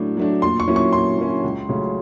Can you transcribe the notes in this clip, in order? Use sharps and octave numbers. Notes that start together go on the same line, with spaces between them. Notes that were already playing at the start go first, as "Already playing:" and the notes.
Already playing: A2 F#3 A3 D4
F#3 A3 D4
A#2 C6
C#6
F#3 A#3 C#4 E4
C#6
A#2 C6
F#3 A#3 C#4 E4
C#2
C#3 F#3 A3 C#4